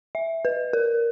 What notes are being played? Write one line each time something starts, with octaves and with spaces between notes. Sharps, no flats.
E5
B4
A#4